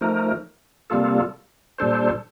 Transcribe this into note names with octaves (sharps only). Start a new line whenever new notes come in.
F3 A3 D#4 A#4
C3 G3 A#3 F4 A4
A#2 G3 D4 A4 C5